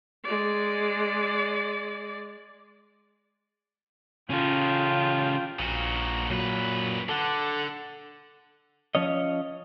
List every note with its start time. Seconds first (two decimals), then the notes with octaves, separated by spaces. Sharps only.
0.25 G#3 D5
4.30 C#3 C#4 F4 A4 G5
5.59 A#1 A#2 F#4
6.30 F#2 A#2 F#3 B4
7.09 D3 A4 F#5 D6
8.95 F3 C#4 C#5 D#5